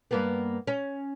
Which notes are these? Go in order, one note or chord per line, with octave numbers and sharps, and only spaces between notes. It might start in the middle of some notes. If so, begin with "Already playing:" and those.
G2 A#3 B3
C#4